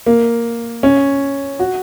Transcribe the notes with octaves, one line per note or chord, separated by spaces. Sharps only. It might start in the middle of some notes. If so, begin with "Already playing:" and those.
A#3
C#4
F#4